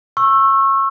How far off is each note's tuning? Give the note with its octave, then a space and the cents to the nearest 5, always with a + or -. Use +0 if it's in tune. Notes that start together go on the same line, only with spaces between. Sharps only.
C#6 -25 E6 +10